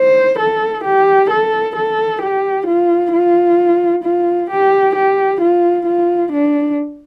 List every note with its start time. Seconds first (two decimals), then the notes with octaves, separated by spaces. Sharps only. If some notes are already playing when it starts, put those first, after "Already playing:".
Already playing: C5
0.39 A4
0.85 G4
1.30 A4
1.76 A4
2.22 G4
2.67 F4
3.13 F4
4.04 F4
4.51 G4
4.96 G4
5.41 F4
5.86 F4
6.33 D4